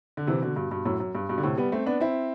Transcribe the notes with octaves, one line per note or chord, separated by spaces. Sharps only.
D3
C3 E3
B2 D3
G2 B2
G2 B2
F#2 A2
F#2
G2
G2 B2
D3
A2 C3
G3 B3
A3 C4
B3 D4
C4 E4